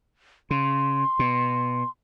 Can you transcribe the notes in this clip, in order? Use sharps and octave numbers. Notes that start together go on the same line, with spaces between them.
C#3 C6
B2